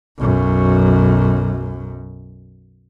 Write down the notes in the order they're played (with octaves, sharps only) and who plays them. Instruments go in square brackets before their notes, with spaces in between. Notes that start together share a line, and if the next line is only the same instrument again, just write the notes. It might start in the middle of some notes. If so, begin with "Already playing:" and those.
[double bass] B1 F#2